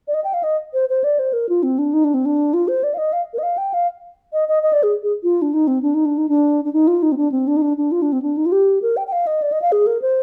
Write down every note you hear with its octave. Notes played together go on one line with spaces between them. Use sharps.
D5
D#5
G5
F5
D#5
C5
C5
D5
C5
A#4
F4
C4
D4
D#4
D4
C4
D4
F4
C5
D5
F5
D#5
F5
A#4
D#5
F5
G5
F5
D#5
D#5
D#5
D5
G#4
G#4
F4
D4
D#4
C4
D4
D#4
D4
D#4
D4
D4
D#4
F4
D#4
C4
D4
C4
D4
D#4
D4
D4
F4
D4
C4
D4
D#4
F4
G4
A#4
G5
G5
F5
D#5
D5
D#5
F5
G#4
A#4
C5